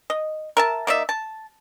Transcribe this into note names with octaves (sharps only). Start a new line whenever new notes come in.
D#5
A#4 E5 A5
A#3 D#4 D5 E5
A5